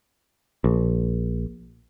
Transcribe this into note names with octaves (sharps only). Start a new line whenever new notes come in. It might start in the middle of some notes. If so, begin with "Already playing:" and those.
A#1